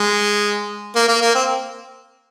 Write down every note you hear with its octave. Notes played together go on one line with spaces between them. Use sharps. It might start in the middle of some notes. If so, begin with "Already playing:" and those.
Already playing: G#3
A#3
A#3
A#3
C4